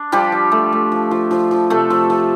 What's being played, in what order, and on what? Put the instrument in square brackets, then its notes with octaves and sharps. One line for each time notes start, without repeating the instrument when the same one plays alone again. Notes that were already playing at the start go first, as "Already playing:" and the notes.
Already playing: [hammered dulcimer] D4
F3 G3 G4
F3
A3
A3
F3
F3
F3
F3
C3 A3 A4
F3
F3